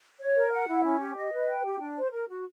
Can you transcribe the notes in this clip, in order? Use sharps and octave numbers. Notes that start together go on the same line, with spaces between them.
C#5
A#4
F#5
E4
C#4
G4
D#5
B4
G5
G4
D4
C5
A#4
F#4